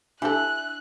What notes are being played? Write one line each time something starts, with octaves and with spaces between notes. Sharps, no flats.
D4 E4 G4 A4 E5 F#6